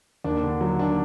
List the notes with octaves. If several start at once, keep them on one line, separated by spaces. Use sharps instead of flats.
D#2 D4
D3
F#3
D#2 D4